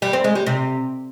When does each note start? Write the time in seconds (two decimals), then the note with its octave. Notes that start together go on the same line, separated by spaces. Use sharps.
0.02 G3
0.13 C4
0.24 G#3
0.35 G3
0.46 C3